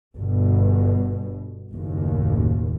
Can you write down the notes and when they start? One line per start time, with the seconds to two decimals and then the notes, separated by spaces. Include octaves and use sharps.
0.18 G1 B2
1.74 F#1 D#2 A2